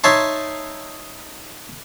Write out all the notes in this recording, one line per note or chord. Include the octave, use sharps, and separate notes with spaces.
D#4 C#5 E5 A5 C6